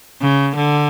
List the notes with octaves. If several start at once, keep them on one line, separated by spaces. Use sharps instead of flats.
C#3
D3